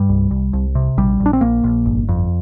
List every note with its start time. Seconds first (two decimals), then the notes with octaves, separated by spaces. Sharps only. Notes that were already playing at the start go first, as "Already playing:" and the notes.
Already playing: G2 G3
0.09 C2
0.31 C2
0.53 C2
0.75 C3
0.97 A#1 G3
1.20 A#1
1.26 D4
1.33 C4
1.41 A#1 A#3
1.64 A#1
1.86 G1
2.09 F2